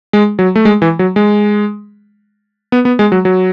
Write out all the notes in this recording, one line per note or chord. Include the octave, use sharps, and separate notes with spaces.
G#3
F#3
A3
G#3
E3
F#3
G#3
B3
B3
G#3
F#3
F#3